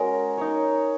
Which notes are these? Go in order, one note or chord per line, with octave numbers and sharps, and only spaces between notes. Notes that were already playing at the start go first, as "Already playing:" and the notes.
Already playing: G#3 C#4 F#4 A#4
D#4 A#4 C#5